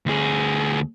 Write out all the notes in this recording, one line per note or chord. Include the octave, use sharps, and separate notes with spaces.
D2 G#4